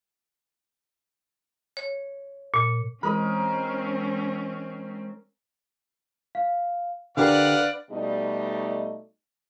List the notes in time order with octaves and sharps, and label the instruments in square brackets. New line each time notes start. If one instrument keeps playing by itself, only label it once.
[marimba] C#5
A#2
[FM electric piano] E3 G#3 [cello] C4 C#4 [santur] A#4 D#5 [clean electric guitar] B5
[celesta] F5
[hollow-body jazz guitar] D3 G4 A#4 [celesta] D4 [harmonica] B4 F5 F#5 [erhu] D5
[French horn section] B2 G3 A3 D#4 D5 D#5